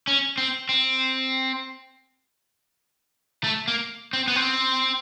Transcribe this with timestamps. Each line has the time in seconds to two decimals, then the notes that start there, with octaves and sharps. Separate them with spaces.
0.07 C#4
0.38 C4
0.69 C4
3.44 A3
3.68 A#3
4.13 C4
4.28 B3
4.36 C4